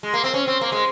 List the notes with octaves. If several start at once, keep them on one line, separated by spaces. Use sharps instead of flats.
G#3
A#3
C4
C#4
C4
A#3
G#3